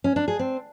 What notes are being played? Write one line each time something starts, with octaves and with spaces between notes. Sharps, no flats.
C#4
D4
G#4
C4